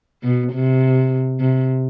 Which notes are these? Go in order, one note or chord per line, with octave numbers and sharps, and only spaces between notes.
B2
C3
C3